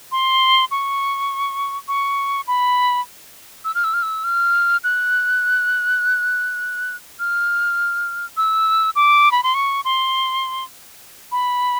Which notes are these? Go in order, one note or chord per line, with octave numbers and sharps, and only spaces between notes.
C6
C#6
C#6
B5
E6
F6
E6
F6
E6
F6
F#6
F6
E6
D6
B5
C6
C#6
C6
B5